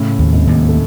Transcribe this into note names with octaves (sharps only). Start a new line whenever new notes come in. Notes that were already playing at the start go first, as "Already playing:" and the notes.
Already playing: A2 C#3
D#2
G#2 C3
D#2
A3